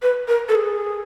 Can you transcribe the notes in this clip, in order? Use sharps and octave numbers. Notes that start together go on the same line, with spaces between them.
B4
A#4
A4
G#4